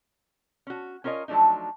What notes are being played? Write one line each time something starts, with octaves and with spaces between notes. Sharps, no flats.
C#4 F#4
C#4 F4 A#4 C#5 D#5
F3 F#3 A3 D4 D#4